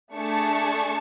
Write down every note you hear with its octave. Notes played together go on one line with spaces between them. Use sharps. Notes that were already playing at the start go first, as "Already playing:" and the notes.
A3 D4 G#4 A5 C#6